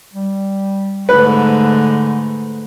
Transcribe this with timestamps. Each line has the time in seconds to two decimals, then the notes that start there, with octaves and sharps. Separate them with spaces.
0.13 G3
1.09 G#2 D3 A3 B4